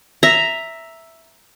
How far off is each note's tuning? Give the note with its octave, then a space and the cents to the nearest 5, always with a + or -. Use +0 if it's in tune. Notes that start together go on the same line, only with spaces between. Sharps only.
E5 +0 A#5 +0